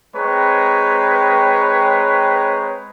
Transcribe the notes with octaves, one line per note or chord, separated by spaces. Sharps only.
G#3 C4 B4 C#5 G5 A#5